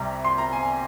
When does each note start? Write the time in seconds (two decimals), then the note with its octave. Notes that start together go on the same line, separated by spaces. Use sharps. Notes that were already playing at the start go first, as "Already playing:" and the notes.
Already playing: C2 C3 G3 A#5
0.24 C6
0.38 A#5
0.53 G#5